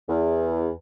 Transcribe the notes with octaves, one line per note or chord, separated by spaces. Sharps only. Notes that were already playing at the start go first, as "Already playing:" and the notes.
E2